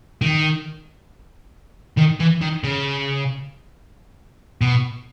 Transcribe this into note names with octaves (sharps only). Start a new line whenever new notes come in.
D#3
D#3
E3
D#3
C#3
B2